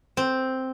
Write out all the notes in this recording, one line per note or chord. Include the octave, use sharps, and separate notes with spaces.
C4